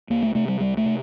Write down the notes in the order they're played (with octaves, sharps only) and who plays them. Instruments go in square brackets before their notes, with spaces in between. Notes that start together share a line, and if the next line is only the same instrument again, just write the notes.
[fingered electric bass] C2 A#3
A3
C3 A3
G3
C2 G3
A3
C3